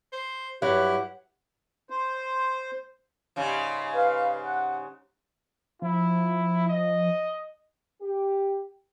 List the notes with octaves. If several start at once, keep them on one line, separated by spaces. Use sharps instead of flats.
C5
G2 F#3 E4 G4 F#5
C5
G#2 C#3 G3
B4 F5
F#5
F3 E4
D#5
G4